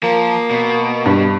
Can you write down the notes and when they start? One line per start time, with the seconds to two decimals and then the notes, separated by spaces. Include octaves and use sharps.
0.03 F3 A#3
0.50 B2
1.06 G2